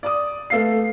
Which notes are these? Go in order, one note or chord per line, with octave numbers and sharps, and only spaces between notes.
D5 D6 D#6
A3 A4 B4 F5 C7